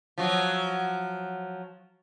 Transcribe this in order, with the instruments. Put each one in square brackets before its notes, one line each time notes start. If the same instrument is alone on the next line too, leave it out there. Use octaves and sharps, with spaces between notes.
[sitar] F3 F#3